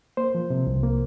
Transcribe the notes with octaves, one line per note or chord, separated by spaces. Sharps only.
A#3 C5
F3
C3
C2
A#3